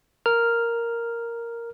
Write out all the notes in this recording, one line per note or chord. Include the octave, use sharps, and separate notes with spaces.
A#4 F6